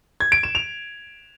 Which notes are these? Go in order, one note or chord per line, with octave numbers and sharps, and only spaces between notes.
G#6
D7
E7
F7